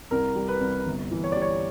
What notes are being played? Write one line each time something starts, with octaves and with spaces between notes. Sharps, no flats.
C2 A#4
G3
B4
C2
G1
E3
C#5
G3 D5
C#5